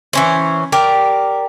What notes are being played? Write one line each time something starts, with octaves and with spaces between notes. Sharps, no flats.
E3 C#4 C5
G4 A#4 D5